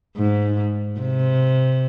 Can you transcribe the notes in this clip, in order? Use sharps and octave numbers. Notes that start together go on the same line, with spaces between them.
G#2
C3